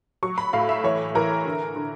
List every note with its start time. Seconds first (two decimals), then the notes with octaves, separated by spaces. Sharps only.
0.23 F#3 C#6
0.38 B5
0.53 A2 F5
0.69 E5
0.84 E3 C#5
1.15 E3 A#4
1.46 D3
1.76 D3